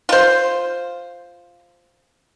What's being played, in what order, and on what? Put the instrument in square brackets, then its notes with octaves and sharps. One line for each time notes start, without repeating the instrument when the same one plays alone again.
[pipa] F4 C5